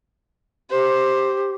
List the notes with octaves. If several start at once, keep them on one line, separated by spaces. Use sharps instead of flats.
G4 C5